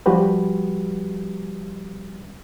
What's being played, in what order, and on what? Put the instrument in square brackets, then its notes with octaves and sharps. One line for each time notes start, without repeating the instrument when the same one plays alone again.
[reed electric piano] F3 G3 F#4 G4 B4